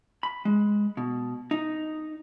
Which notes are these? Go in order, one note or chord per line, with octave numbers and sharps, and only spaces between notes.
B5
G#3
B2
D#4